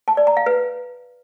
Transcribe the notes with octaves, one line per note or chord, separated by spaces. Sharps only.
A5
D5
A#5
F5
B4